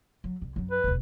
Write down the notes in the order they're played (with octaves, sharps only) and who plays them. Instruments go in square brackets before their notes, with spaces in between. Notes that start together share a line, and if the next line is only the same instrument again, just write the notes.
[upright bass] F#3
C2
F#2 F#3
[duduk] B4
[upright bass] E1 D2